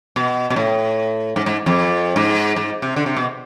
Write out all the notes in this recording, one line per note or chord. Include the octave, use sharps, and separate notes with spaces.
B2
B2
A2
G#2
G#2
F2
G#2
G#2
C3
D3
C3
B2